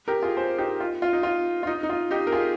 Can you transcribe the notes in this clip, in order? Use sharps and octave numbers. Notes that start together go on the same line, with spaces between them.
G4 A#4
F4 G#4
G#4 C5
D#4 G4
F4
F4
D#4
F4
F4
D#4
D#4
F4
D#4 G4
A#4
F4 G#4